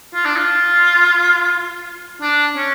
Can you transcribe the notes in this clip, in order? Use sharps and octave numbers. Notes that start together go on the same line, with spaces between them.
F4
D4
F4
D4
C#4